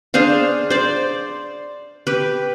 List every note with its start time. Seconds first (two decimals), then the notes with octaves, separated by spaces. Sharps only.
0.14 D4 G#4 C5 F5
0.70 C5 D5
2.07 G4 B4